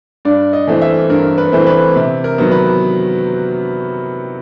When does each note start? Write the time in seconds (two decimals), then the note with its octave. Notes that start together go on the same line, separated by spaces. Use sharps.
0.25 G2 D5
0.53 D#5
0.67 E3 A3 C4
0.82 E5
1.10 G2 A#4
1.38 B4
1.52 E3 A3 C4
1.67 B4
1.96 C3
2.24 A#4
2.38 D#3 F#3 B3
2.51 B4